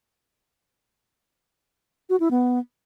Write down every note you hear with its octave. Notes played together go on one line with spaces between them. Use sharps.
F#4
E4
B3